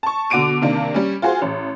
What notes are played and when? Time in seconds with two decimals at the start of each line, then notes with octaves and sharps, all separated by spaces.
0.03 A5 C#6
0.30 B2 D3 F#4 D6 D7 D#7
0.62 C3 D#3 A#3 D4
0.94 G3 C#4
1.22 F4 F#4 G#4 C5
1.42 A1